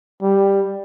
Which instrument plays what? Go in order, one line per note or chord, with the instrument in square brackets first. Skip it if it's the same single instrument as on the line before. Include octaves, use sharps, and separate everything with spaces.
[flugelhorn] G3